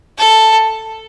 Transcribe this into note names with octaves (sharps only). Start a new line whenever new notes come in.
A4